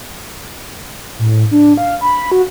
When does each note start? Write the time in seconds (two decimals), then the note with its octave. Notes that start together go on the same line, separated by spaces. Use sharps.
1.19 A2
1.51 D4
1.77 F5
2.01 B5
2.32 F#4